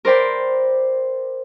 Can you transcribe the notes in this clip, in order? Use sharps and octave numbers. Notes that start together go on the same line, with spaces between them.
A#4 C5 D5 G5 B5